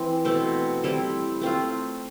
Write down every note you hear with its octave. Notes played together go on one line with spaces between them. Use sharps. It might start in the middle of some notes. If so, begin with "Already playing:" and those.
Already playing: E3 C4
B2 A3 C4
G3 C4 E4 A4
A3 C4 F4